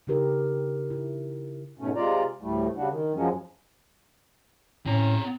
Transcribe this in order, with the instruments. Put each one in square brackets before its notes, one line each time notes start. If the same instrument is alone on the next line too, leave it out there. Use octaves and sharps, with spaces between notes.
[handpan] C#3 D4 D#4 G4 A#4
E4
[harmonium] G#2 B2 A3 C#4
C3 G#3 F4 D5 A#5
D2 A2 G3 A3
C#3 G3 D4 F#4
D#3
F#2 F3 F#3 G#3 C#4
[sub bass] A2 [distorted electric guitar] C4 A#5 [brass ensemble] C#4